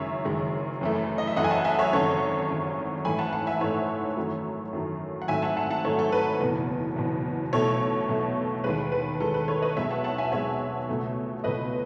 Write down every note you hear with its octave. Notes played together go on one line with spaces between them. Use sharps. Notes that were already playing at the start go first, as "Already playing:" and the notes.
Already playing: F#1 F#2 D#3 G#3 C#5 E5
F#1 F#2 D#3 G#3
F#2 E3 A3
D#5
E5
F#2 E3 A3 D#5 F#5
G#5
F#5 A5
E5 G#5
C#5 E5
G#1 F#2 C#3 A4 C#5
G#1 F#2 C#3
A1 G#2 E3 A3 G#5 B5
F#5 A5
F#5 A5
E5 G#5
A1 G#2 E3 A3 C#5 E5
F#2 D#3 F#3 A3
F#2 D#3 F#3 A3
F#5
G#1 G#2 F#3 A3 E5 G#5
F#5 A5
F#5 A5
F#5 A5
G#1 G#2 F#3 A3 A4 C#5
A4
B4
F#1 E2 B2
F#1 E2 B2
B1 B2 A3 A4 C#5
B1 B2 A3
D#2 D#3 G#3 B4
B4
D#2 D#3 G#3 A4
B4
A4 C#5
B4 D#5
B1 B2 G#3 C#5 E5
F#5 A5
F#5 A5
E5 G#5
B1 B2 G#3 C#5 E5
C#2 B2 A3
C#2 B2 A3 B4 D#5